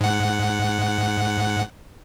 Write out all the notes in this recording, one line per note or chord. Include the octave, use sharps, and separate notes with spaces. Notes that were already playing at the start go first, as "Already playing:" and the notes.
G#2 F#5